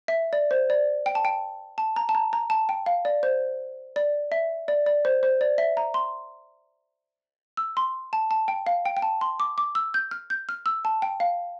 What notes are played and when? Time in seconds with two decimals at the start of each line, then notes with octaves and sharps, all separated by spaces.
0.08 E5
0.33 D5
0.51 C5
0.70 D5
1.06 G5
1.15 A5
1.25 G5
1.78 A5
1.96 A#5
2.09 A5
2.15 A#5
2.33 A#5
2.50 A5
2.69 G5
2.86 F5
3.05 D5
3.23 C5
3.96 D5
4.32 E5
4.68 D5
4.86 D5
5.05 C5
5.23 C5
5.41 D5
5.58 E5
5.77 A#5
5.94 C6
7.57 E6
7.77 C6
8.13 A5
8.31 A5
8.48 G5
8.67 F5
8.85 G5
8.97 G5
9.02 A5
9.21 C6
9.40 D6
9.58 D6
9.75 E6
9.94 G6
10.11 F6
10.30 G6
10.49 F6
10.66 E6
10.85 A5
11.02 G5
11.20 F5